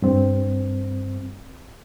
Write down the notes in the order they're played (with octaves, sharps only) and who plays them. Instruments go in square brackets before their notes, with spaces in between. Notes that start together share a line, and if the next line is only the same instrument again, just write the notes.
[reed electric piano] G2 C4